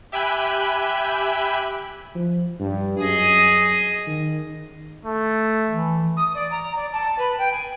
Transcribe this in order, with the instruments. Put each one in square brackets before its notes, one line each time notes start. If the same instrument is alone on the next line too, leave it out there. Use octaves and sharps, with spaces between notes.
[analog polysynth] G4 E5 G5 G#5 B5 F#6
[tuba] F3
G2
[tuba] F#2 [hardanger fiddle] G#4 D#5
[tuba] D#3
[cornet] A3
[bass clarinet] E3
[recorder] D#6
D5
A#5
D5
A5
B4
G5
G#5